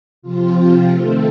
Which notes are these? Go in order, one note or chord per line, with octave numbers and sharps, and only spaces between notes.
C3 F3 C4 F4
F4
D#3 A3 C4 A4